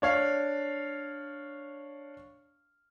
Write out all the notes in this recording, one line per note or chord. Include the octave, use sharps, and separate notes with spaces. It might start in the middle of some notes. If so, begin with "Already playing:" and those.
D4 C#5 F5